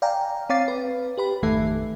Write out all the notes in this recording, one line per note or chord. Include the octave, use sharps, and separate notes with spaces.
D5 F5 G5 G#5 A#5
C4 C#5 F5 D6 A6 C7
B4
G4 B4 B5
G#1 F2 D#3 A3 A4 E5